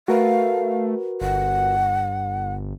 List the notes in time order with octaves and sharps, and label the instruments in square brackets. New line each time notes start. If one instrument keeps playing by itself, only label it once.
[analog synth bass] A3 [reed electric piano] F#4 A#4 B4 [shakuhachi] F5
[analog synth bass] G1 [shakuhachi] F#5